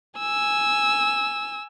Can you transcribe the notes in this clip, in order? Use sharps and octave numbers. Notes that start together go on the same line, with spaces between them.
G#5 E6